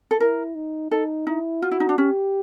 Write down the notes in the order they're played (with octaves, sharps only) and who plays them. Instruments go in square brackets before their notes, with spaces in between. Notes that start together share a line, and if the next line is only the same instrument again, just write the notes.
[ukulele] A4
[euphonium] E4 [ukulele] A#4
[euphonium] D#4
[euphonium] D#4 [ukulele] A4
[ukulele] D#4 [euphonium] E4
[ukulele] F4 [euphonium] F#4
[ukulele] E4
D#4
D4
[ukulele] C#4 [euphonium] G4